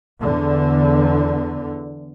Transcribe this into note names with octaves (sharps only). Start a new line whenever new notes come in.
E2 D3